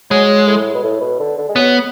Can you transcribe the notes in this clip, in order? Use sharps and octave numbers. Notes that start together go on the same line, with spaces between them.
F#3 G#3
A2
B2
A2
B2
D3
D3
G#3
F#3 B3